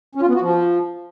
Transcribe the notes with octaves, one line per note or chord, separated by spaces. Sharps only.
C#4
F4
B3
F#4
F3